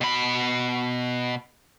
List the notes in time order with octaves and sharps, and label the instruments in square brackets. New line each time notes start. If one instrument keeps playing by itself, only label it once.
[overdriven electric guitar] B2 B5